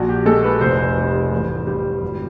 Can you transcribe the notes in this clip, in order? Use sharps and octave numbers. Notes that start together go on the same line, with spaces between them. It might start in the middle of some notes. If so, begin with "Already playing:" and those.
Already playing: A#1 F#4
G4
G#3 A4
B4
F1 C5
G3
A1
G3
G#1